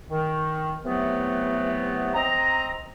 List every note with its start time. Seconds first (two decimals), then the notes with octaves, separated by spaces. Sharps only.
0.10 D#3
0.84 C3 E3 F#3 A3 B3
2.14 C4 D#5 A#5